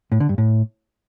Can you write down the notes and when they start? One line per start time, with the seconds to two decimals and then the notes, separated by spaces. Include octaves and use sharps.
0.12 A2
0.20 D3
0.29 G2
0.38 A2